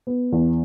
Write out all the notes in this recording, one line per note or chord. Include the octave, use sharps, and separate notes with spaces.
B3
E2